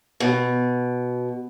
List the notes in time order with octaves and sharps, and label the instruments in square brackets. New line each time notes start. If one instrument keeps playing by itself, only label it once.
[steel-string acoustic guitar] B2